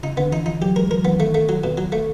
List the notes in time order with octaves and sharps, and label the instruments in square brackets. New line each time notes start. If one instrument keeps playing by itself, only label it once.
[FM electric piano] C#3 [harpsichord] D#4
[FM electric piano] D3 [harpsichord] B3
[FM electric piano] E3 [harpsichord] D#4
[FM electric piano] F3 [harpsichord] D#4
[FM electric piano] F#3 [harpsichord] G4
[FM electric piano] G#3 [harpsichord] A#4
[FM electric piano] F#3 [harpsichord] A#4
[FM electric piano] E3 [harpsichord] B3
[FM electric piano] D#3 [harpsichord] A3
[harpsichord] A3
F#3
B2
F#3
A3